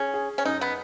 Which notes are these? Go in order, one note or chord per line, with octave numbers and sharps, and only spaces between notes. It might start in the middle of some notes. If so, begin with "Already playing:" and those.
Already playing: C#4 G#4
G#4
C#4
F#2 D#4
B3